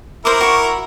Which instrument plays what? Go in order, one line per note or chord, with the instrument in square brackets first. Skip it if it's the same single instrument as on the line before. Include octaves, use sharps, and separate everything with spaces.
[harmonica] E4 A#4 [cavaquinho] C5 B5 D6
[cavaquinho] F#4 C#6